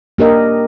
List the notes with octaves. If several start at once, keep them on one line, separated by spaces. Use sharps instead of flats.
A#3 D4 G4 A#4 D#5